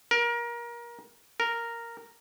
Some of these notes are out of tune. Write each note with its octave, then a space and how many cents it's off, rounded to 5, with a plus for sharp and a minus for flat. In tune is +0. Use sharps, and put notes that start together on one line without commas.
A#4 +25
A#4 -5